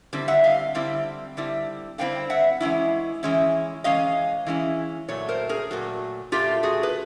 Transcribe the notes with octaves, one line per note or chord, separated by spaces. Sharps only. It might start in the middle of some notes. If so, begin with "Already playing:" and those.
D3 G3 C4 E4
E5 F#5
D#5 F5
D3 G3 C4 E4
D3 G3 C4 E4
D3 G3 C4 E4 F5 G5
E5 F#5
E3 G#3 C#4 E4
E3 G#3 C#4 E4
E3 G#3 C#4 D#5 F5
E3 G#3 C#4 E4
A#2 F#3 A3 C#5
A#4 C5
G#4 A#4
A#2 F#3 A3 F#4
A#2 F#3 A3 F4 G4
F#4 G#4
B4